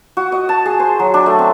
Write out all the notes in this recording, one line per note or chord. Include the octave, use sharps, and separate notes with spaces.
F#4
D#5
A5
G#4
C5
F#3
D4
A3
C4